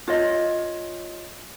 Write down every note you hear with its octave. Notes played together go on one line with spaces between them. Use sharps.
F4 C#5 D#5